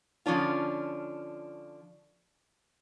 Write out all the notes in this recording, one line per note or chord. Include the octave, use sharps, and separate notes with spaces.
D3 F3 C#4 D4 F4